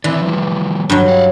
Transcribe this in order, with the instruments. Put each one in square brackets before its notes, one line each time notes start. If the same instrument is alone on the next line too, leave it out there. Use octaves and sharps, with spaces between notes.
[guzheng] E3 [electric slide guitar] C4 E4 D5
[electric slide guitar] F3 G3
[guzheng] G2 F#3
[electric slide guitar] F5 F#5